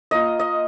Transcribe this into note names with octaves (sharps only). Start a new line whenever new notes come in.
A#3 F4 D#5
D#5